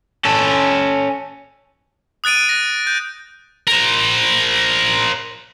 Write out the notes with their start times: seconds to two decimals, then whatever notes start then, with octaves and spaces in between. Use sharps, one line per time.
0.25 C#4 A4
2.24 D#6 F#6 A6 D7 D#7
2.49 F#6 A#6
2.87 G6
3.67 A#4 C5